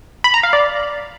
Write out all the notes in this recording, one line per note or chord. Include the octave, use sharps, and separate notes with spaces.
B5
A#5
F5
D5